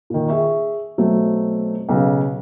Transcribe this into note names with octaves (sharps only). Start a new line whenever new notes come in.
A#2 D#3
G#4 E5 C#6
B2 F#3 A3 C4
B1 C#3 B4